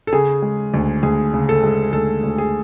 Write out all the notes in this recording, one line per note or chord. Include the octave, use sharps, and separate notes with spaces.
A4
C#3 G#4
G#3
D2
D2 G#4
C#3
A4
G#3
D2 A4
D2
G#4